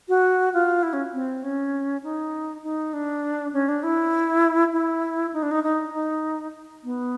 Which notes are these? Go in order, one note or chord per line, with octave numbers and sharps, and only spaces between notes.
F#4
F4
E4
C#4
C4
C#4
D#4
D#4
D4
C#4
D4
E4
E4
D#4
D4
D#4
D#4
D#4
B3